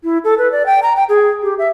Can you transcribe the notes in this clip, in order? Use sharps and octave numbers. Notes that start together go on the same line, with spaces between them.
E4
A4
B4
D5
G5
A#5
G5
G#4
G4
E5